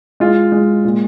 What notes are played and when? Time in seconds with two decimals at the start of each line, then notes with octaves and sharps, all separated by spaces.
0.20 G#3 F4
0.52 G#3
0.85 A#2